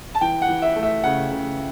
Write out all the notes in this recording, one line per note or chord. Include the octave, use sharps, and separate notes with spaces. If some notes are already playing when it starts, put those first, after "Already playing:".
A5
E3 G5
F#5
E3
E5
A3
E5
C#3 F#5
C#3